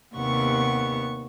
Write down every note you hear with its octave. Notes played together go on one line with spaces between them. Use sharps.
D#2 C3 B3 F#5 C#6